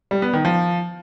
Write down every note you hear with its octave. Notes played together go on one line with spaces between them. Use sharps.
G3
B3
D#3
F3